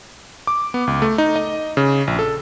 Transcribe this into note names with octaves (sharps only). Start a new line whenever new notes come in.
D6
B3
C#2
A3
D#4
D#5
C#3
A#1
A4